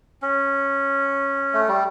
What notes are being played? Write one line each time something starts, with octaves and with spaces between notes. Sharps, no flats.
C#4
A3
G3